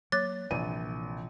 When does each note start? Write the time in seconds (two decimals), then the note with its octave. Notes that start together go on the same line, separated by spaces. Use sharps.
0.12 F#3 A#3 C#5 D6 F#6 A6
0.51 A#1 C3 E3 F3 D#7